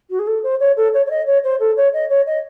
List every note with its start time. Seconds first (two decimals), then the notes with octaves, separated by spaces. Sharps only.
0.10 F#4
0.19 G#4
0.27 A4
0.43 C5
0.60 C#5
0.76 A4
0.94 C#5
1.06 C#5
1.10 D#5
1.26 C#5
1.44 C5
1.59 A4
1.76 C#5
1.93 D#5
2.09 C#5
2.26 D#5